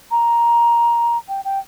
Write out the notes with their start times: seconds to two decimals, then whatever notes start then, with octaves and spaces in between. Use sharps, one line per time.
0.11 A#5
1.28 G5
1.45 G5